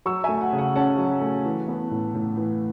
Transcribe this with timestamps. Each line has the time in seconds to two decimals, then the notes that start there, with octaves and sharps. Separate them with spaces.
0.06 F#3 C#6 E6
0.24 A3 E5 G#5
0.41 F#5
0.53 C#3
0.58 F#5
0.75 C#4 F#5 A5
0.98 F#3
1.21 A3
1.45 E3
1.68 B3
1.91 A2
2.14 A2
2.37 E3